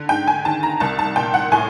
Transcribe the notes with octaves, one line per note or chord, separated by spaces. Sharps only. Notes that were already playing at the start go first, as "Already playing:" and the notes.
Already playing: D3
G#2 G5
G#5
D#3 A5
A#5
C2 A5
A5
A#2 G5
F#5
A2 G#5